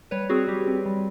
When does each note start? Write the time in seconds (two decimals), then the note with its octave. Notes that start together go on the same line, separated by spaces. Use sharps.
0.11 G3 B4 C#5
0.29 C4 F#4 G#4
0.48 G3 G4
0.67 C4
0.86 G3